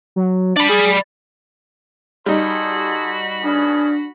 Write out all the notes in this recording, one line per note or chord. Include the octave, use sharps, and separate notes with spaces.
F#3
D4 D5 B5
G#4
G3 D#4 F#4 G#4 A4 B5 C6
B3 C#4 D4 G#4